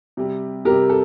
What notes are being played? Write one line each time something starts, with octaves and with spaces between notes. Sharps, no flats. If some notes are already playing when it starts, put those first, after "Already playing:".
C3 G3
C3 G3 G4 A#4
A4